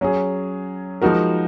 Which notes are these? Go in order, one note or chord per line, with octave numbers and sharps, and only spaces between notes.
F#3 C#4 G#4
F3 G#3 D#4 F#4 A#4